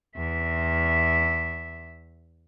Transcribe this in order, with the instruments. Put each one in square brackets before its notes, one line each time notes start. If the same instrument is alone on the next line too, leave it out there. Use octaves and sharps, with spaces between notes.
[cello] E2 E5